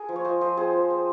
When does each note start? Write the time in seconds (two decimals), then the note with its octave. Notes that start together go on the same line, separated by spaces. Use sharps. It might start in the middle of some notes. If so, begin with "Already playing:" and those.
Already playing: G#4 A#4
0.09 F3
0.16 C#5
0.25 F4 C5 D#5
0.41 F3 C5 D#5
0.57 C4 G#4 C5
0.73 F3
0.90 C4